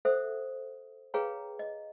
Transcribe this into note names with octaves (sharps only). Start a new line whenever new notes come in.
A4 C5 E5 F#5 D#6
G#4 B4 C#5 F5 G5 A#5
D#5